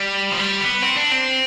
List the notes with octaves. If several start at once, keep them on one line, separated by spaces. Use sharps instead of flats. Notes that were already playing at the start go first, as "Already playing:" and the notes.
Already playing: G3
F3
G3
B3
C4
D4
C4